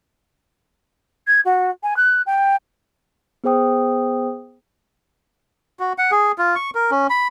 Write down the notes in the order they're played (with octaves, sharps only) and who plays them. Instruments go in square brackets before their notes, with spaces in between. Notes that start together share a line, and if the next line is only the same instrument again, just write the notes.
[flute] G#6
F#4
G#5
F#6
G5
[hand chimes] B3 G#4 C5 G5 D#6
[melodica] F#4
F#5
G#4
F4
C#6
A#4
C#4
B5